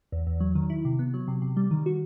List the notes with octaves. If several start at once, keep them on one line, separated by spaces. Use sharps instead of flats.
E2
E2
F#3
D#3
E4
C3
B3
F#3
C3
C3
G3
D#3
F#4